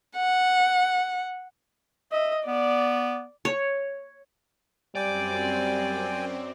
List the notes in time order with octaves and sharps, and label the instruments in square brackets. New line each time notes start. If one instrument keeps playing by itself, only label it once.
[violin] F#5
[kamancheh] D#5 [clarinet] E5
[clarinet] B3 [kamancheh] D5
[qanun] C#5
[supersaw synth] F#2 C4 [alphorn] G3 [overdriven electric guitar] D5 [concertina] G5 G#5